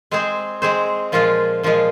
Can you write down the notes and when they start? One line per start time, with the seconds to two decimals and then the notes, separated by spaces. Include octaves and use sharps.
0.11 G#3 C4 G#4 C5
0.62 G#3 C4 G#4 C5
1.12 A#2 F3 G#3 F4
1.63 A#2 F3 G#3 F4